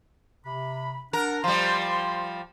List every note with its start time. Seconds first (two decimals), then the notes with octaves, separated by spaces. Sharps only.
0.46 C3 B5
1.13 D4 A#4 F#5
1.44 F3 G3 C6